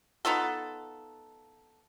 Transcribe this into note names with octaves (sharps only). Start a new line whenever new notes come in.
B3 D#4 F4 A4